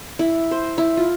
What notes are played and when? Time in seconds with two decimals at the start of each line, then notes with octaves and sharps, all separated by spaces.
0.19 E4
0.51 C5
0.78 E4
0.97 F4